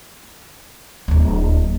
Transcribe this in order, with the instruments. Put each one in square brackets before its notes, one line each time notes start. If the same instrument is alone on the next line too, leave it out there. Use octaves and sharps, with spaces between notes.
[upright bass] D1 D#2